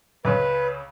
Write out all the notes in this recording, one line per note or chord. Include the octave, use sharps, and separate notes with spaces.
C#2 C#3 B4